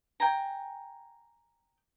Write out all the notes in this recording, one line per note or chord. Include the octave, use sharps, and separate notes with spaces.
G5 G#5 A#5